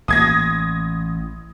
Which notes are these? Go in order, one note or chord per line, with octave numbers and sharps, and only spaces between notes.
A1 A#3 D#6 G#6 A#6